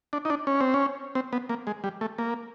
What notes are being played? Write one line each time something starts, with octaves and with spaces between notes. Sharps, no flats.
D4
D#4
D4
C#4
C4
C#4
C4
B3
A#3
G#3
G3
A3
A#3